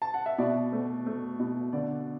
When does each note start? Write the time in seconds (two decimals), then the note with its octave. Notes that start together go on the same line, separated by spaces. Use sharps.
0.02 A5
0.14 F#5
0.26 E5
0.38 B2 D5
0.73 A3
1.06 A3
1.39 B2
1.73 D3 D5